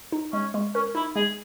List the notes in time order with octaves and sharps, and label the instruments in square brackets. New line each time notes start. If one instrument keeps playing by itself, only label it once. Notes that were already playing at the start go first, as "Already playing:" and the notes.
[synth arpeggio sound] D#4
[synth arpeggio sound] G#3 [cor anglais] C#4
[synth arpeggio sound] G#3
[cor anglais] C#4 [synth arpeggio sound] A#4
[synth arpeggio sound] D#4 [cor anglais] E4
[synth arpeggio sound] G#3 [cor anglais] G#4